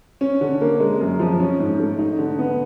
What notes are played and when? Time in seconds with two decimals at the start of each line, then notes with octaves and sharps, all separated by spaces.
0.21 C#4
0.41 D3
0.61 A#3
0.80 G#3
1.00 F#2
1.20 F3
1.40 C#4
1.60 G#2
1.79 A3
1.98 D#4
2.18 D3
2.39 B3